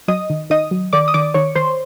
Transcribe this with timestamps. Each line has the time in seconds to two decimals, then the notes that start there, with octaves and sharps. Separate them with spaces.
0.08 F#3 D#5 D#6
0.30 D#3
0.50 D#3 D#5 D#6
0.71 F#3
0.93 D#3 D5 D6
1.08 D#6
1.14 D#3 D5 D6
1.34 D#3 C#5 C#6
1.55 D#3 C5 C6